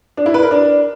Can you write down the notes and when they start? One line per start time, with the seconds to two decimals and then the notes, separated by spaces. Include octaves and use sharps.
0.17 D4
0.26 E4
0.34 B4
0.43 A#4
0.51 D4